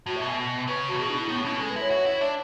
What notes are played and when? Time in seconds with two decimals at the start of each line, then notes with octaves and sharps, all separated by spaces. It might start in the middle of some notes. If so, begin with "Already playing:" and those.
0.06 A2 F#4
0.16 E5
0.21 B2
0.27 G#5
0.68 C#3 B4
0.88 A2 F#4
0.99 B2 G#4
1.09 D4
1.19 E4
1.29 A2 B3
1.44 B2 C#4
1.59 G#3 A4
1.70 B4
1.76 E4 C#5
1.90 F#4
2.06 E4
2.21 D4